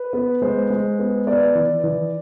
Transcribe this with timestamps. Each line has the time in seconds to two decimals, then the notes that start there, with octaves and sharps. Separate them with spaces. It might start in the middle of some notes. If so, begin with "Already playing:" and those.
Already playing: B4
0.13 B3
0.42 G#3 C5
0.70 G#3
0.99 B3
1.27 B3 D5
1.55 E3
1.84 E3